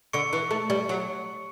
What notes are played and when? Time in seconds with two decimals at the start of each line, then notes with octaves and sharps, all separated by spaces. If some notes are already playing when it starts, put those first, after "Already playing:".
0.13 D3 C#6 C#7
0.33 E3
0.51 A3
0.70 G3
0.89 F#3